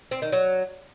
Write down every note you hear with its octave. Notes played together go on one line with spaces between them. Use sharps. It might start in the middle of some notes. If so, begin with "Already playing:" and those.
C4
D#3
F#3